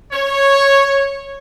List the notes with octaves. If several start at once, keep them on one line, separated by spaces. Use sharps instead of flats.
C#5